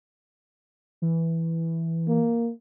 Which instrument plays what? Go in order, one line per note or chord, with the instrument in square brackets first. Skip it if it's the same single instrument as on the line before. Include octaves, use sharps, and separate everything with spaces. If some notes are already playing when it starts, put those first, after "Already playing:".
[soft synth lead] E3
[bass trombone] A#3